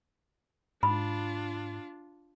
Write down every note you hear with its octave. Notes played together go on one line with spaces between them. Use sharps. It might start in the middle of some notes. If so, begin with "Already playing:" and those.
G#2 D4 F4 B5